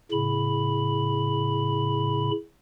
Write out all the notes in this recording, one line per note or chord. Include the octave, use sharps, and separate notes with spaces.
A2 C#3 B5